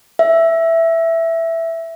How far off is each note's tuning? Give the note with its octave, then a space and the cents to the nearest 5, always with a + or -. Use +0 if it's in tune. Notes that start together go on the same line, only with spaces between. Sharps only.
E5 +5